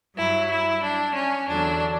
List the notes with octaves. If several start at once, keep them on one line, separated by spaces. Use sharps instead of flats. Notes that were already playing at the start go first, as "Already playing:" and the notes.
G2 F#3 E4
E4
D4
C#4
E2 D3 F#3 D4